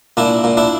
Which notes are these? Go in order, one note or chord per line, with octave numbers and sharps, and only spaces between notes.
A#2 D4 E4
A#2
D4 E4